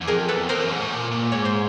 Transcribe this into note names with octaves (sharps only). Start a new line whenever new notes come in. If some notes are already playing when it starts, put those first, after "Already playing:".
E2
F2 G#4 A#4
E2 A4 B4
F2 A#4 C5
F#2
G#2
A2
A#2
A#2
G#2 C#5
C5